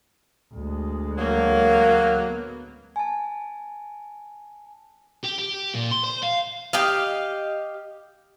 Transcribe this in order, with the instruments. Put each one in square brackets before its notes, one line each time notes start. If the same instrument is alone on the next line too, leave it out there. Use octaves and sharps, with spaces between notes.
[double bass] D2 G#3
[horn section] F#3 A#3
[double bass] B3
[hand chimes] G#5 A5
[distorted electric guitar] G4
G4
A#2
C6
C5
F5
[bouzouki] G4 D#5 F5